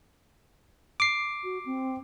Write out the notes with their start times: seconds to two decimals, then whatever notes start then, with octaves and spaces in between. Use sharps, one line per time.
1.00 D6 C7
1.44 F#4
1.66 C4